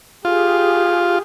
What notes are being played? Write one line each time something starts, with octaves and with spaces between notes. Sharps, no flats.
F4 G4 G#4